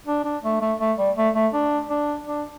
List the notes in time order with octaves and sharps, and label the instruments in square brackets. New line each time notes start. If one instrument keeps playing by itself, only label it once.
[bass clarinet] D4
D4
A3
A3
A3
G3
A3
A3
D4
D4
D4